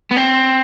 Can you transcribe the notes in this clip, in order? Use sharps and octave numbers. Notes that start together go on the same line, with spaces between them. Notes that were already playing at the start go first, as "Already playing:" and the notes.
B3
C4